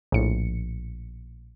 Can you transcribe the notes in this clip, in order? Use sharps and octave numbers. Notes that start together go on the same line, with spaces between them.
A#1 A2 C#7